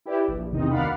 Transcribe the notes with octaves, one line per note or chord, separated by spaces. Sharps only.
E4 G4 B4 D5
A#1
E2 C3 D#3 C4 D#4 D#5
D2 A#4 D5 F5 F#5 B5